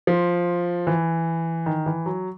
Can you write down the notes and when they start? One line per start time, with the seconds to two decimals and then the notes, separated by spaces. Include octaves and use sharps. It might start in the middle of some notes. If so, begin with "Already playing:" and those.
0.07 F3
0.87 E3
1.66 D#3
1.86 E3
2.06 F#3